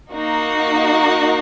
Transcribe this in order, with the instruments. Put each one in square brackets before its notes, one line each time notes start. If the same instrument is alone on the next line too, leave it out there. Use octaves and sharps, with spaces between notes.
[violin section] A#3 D#4 F#4